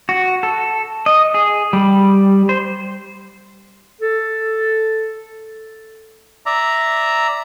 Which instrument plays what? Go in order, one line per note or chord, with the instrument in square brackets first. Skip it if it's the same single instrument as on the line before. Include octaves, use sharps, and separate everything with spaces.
[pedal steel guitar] F#4
A4
D#5
G#4
G3
C5
[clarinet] A4
[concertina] D5 E5 A#5